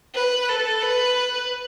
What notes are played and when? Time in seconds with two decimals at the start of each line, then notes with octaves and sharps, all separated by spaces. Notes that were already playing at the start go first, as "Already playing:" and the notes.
0.15 B4
0.49 A4
0.82 B4